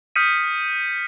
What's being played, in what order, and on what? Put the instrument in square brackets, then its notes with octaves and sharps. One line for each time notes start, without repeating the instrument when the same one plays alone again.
[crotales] D#6 F6 G6 B6 C#7 D#7